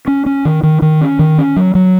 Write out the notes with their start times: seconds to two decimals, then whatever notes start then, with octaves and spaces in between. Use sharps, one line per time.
0.07 C#4
0.26 C#4
0.45 D#3
0.63 D#3
0.82 D#3
1.01 C#4
1.19 D#3
1.38 C#4
1.56 F#3
1.75 F#3